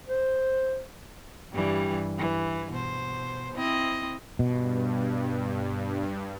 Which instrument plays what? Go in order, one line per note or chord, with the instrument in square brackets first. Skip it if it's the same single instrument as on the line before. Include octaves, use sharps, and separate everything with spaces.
[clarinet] C5
[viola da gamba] G2 E3 G3
E3
B2 C5
C4 E4 D#5
[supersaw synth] G2 [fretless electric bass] B2